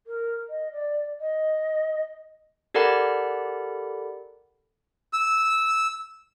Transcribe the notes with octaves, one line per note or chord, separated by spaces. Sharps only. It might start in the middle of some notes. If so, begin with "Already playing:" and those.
A#4
D#5
D5
D#5
G4 A4 A#4 D5 F#5 B5
E6